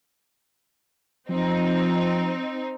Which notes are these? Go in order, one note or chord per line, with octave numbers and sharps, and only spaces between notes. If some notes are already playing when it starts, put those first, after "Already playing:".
F3 C4 D#4